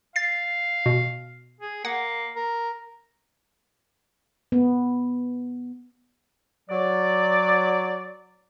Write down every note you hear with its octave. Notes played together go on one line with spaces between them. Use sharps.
F5 A6 C7
B2
G#4
A#3 F#5
A#4
B3
F#3 D5